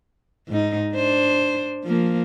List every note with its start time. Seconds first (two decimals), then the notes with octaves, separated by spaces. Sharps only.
0.48 G#2 D#4
0.95 D4 C5
1.85 F3 A#3